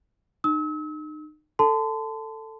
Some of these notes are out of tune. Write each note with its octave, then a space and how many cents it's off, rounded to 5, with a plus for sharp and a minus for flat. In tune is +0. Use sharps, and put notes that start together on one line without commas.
D#4 -35 E6 -40
A4 +10 A5 +0 C6 -40